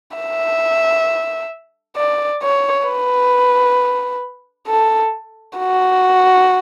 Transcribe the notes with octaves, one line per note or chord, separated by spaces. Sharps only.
E5
D5
C#5
B4
A4
F#4